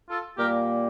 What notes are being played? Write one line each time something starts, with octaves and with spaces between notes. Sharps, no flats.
F4 A4
A#2 G3 A#3 G4 A#4